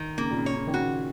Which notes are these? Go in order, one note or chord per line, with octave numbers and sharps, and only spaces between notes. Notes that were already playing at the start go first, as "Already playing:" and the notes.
Already playing: D#3
C#3 A#3
A#2
C#3
C#5
C#3
D#3
C#3 F#4